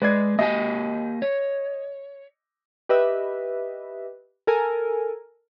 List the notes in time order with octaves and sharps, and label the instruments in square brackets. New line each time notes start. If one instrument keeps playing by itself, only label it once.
[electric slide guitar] G#3 [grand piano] B4 D5 G#6
[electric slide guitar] A#3 G4 G#5 [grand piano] D#5
[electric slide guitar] C#5
[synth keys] G4 B4 D#5 E5
A4 A#4 G#5